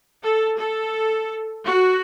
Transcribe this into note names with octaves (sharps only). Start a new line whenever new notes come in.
A4
A4
F#4